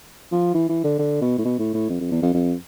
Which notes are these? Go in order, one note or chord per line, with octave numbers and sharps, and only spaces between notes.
F3
E3
E3
D3
D3
B2
A2
B2
A2
A2
F2
F2
E2
F2
F2